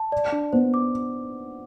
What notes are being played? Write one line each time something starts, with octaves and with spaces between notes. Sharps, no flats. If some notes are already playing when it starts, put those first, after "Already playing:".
Already playing: A5
D5
D4
B3 C5
D6